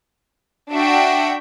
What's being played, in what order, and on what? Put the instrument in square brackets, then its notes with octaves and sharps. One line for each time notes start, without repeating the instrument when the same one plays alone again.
[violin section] D4 F#4 E5 F#5 G5 D7